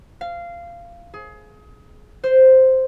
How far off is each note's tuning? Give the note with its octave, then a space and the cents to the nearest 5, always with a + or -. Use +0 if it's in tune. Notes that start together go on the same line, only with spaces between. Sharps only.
F5 -15
G#4 +25
C5 +0